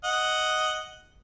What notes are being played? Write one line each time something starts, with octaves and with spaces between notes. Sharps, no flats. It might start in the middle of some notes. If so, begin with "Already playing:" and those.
D#5 F#5